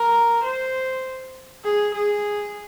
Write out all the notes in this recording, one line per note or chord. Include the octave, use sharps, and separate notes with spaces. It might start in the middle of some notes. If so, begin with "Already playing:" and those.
Already playing: A#4
C5
G#4
G#4